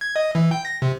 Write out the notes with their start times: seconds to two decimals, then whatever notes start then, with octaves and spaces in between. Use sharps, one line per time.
0.01 G#6
0.16 D#5
0.35 E3
0.51 G5
0.65 A#6
0.82 C3